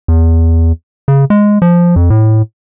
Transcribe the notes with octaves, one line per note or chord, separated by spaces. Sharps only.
E2
C#3
G#3
F3
F2
A2